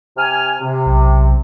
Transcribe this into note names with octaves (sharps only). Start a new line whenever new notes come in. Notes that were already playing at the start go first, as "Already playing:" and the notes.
C3 G#5 F6
C3
B1